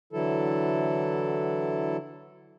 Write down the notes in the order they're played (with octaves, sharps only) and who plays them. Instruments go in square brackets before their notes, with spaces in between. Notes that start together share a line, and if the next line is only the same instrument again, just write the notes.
[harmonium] D3 E3 F#3 E4 A4